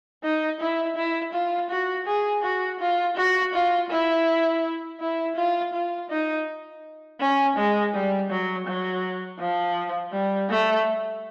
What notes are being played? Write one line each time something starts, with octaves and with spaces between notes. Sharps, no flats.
D#4
E4
E4
F4
F#4
G#4
F#4
F4
F#4
F4
E4
E4
F4
F4
D#4
C#4
G#3
G3
F#3
F#3
F3
G3
A3